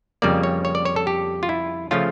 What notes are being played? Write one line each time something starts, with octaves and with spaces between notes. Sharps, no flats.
F2 C#3 G3 A#3 D5
C#5
C#5
D5
C#5
A4
G4
F4
E4
C#3 F3 A3 C#4 F4